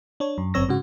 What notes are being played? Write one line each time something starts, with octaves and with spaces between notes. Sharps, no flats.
D4 C#5
F#2
G1 F#2 C4 C#5 E6 A#6
G#2 C#3 F#4